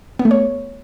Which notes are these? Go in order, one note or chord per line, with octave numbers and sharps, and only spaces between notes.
B3
A3
C#5